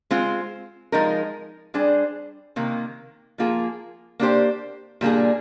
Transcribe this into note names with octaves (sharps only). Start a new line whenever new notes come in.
G#3 C4 F4 C5
F3 G#3 D#4 A#4
G3 D4 G#4 C5
C3 D#3 A#3
F3 A#3 F4 G#4
A#3 D4 G4 C5
A#2 G3 A#3 D4 G#4